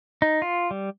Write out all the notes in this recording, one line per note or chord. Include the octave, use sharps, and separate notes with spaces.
D#4
F4
G3